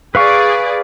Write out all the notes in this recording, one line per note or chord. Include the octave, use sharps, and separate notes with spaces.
G#4 B4 D5 F5 C#6